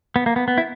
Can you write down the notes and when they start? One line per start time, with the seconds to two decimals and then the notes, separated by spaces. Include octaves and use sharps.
0.16 B3
0.26 A#3
0.36 B3
0.48 B3
0.58 E4